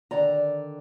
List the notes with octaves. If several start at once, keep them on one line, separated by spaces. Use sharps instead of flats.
D3 D#3 D5 A#5